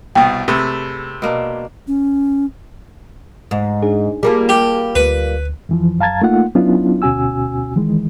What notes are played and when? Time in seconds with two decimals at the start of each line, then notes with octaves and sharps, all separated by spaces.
0.15 C2 B2 G5
0.48 C3 A3 G#4 B4 C#5
1.22 B2 A#3 D4
1.87 C#4
3.51 G#2
3.82 D4 D#4 G#4
4.23 G3 A#3 F4 G#4 A5
4.49 G4
4.95 D2 B4
5.69 F2 E3 F3
6.00 F#2 F5 A5 A#5 G#6 A6
6.22 A3 A#3 D#4 F4 F#5
6.55 F#3 B3 C#4 D4 E4 F4
7.02 D2 B2 C#4 F#4 G#5 E6
7.76 D#3 E3 G#3